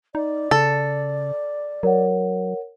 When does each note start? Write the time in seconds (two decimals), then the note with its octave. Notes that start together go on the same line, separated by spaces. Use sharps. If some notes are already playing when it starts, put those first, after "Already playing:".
0.15 D#4 D5
0.51 C#3 A4
1.83 F#3 A#4 C#5 F#5